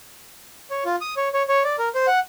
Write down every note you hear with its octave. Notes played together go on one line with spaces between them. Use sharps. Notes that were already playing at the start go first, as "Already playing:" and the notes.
C#5
F4
D#6
C#5
C#5
C#5
D5
A#4
C5
F#5